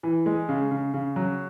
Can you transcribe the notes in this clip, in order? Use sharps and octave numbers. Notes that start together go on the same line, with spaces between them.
E3
G#3
C#3
C#3
C#3
F#3